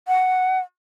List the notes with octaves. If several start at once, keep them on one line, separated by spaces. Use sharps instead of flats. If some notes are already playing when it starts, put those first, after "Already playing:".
F#5